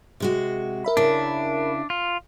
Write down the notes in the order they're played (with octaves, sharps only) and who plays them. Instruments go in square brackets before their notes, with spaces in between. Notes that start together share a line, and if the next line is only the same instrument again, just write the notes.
[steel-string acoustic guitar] C3 G#3 F#4
[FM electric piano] A#4 E5 B5
[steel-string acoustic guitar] C#3 E4 [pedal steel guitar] D4
[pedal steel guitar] F4